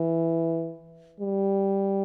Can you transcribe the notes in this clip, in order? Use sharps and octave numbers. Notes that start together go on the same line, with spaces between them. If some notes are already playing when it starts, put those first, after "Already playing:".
Already playing: E3
G3